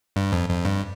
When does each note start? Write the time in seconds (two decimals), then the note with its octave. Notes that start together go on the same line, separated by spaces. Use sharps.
0.16 G2
0.32 F2
0.49 F2
0.65 G2